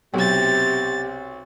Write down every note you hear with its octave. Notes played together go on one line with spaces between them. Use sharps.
B1 C3 G4 A6